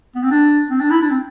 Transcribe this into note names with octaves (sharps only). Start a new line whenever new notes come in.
B3
C4
D4
C4
D4
E4
D4
C4